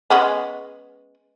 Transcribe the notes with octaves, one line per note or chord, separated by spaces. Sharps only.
G#3 B3 C#4